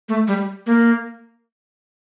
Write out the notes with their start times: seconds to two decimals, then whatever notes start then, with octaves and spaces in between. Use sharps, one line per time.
0.09 A3
0.28 G3
0.66 A#3